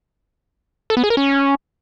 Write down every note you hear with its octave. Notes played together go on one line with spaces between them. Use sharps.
A4
B3
G#4
A#4
C#4